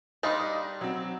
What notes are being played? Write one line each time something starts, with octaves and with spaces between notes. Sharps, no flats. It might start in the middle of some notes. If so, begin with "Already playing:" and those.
G3 D4 D#4 D#5 F5 C6
F#3 C4